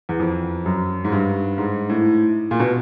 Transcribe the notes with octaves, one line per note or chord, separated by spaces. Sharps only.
E2
F2
F#2
G#2
G2
G#2
A2
A#2
B2